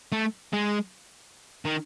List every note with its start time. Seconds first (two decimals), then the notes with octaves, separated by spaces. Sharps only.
0.12 A3
0.53 G#3
1.65 D#3